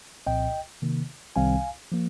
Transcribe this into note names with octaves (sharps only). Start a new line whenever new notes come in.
C2 A#2 F3 C4 D#5 G5
C3 D#3 A#3
C2 C3 D#3 G3 C4 F5 G#5
F3 A#3